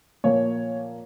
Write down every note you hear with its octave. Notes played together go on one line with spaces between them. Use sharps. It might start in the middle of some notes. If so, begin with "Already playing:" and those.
A#2 F3 A#3 C#5